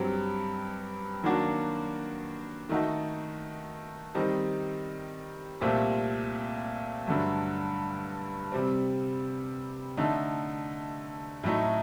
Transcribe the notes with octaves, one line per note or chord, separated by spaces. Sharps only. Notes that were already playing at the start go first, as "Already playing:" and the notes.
Already playing: G2 F#3 C4 G4
D#3 F#3 A#3 D4 F#4
D#3 A3 D#4 F#4
D#3 G3 C4 D#4
C2 A#2 A3 C4 G4
G2 D3 F#3 A3
C3 G3 C4
D3 A3 D#4
A2 F#3 A3 D#4